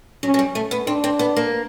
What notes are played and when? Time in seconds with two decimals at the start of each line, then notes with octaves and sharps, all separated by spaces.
0.23 F#3 C#4
0.34 F#3
0.39 G3
0.55 A3
0.71 B3
0.87 C4 D4
1.04 C4
1.19 B3
1.36 A#3